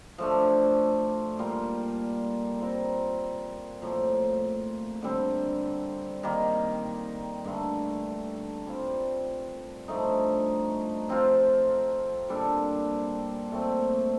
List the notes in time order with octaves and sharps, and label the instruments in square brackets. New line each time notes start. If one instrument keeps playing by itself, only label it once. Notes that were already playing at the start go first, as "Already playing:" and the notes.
[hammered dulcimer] F3 A3 D4
A#2 G3 A#3 F4
G3 C4 F4 A#4
A2 F3 A#3
D3 G3 C4
D#3 G3 A#3
G2 D3 A3
G3 C4 F4
G2 F3 A3 D#4
F3 C4 F4
A#2 G3 D4 A4
A#2 A3 C4